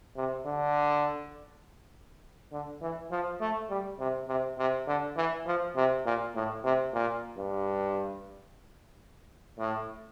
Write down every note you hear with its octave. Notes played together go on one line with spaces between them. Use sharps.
C3
D3
D3
E3
F3
A3
G3
C3
C3
C3
D3
E3
F3
C3
A#2
A2
C3
A#2
G2
A2